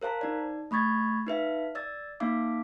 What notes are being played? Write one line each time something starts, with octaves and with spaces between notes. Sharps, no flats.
A#4 C5 F5 A5 A#5
D#4 D5
A3 B5 C#6 G#6 A6
D#4 B4 E5 F5
D5 E6 A6
A#3 D#4 F5 D6